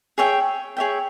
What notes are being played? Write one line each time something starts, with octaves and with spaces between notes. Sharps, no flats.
G#4 C#5 E5 G5
G#4 C#5 E5 G5